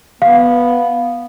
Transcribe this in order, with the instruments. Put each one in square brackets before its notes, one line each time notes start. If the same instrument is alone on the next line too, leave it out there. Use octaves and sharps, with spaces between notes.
[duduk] B3 [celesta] F5